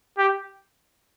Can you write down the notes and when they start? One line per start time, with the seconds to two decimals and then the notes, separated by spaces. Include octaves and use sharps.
0.18 G4